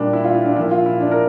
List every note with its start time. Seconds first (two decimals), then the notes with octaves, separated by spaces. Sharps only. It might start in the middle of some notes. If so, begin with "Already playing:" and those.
Already playing: A#2 G3 D4
0.13 E4
0.24 F4
0.35 E4
0.46 D4
0.56 A#2 F3 E4
0.71 F4
0.86 E4
1.00 D4
1.11 A#4